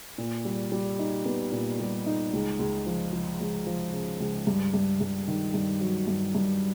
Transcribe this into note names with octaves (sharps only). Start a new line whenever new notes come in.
A#2
G3
G3
D#4
B3
A#2
G3
D#4
C#2
C#2
F3
F3
C#2
F3
C#3
C#2
G2
G2
G2
D#3
G2
F#3
G2
G2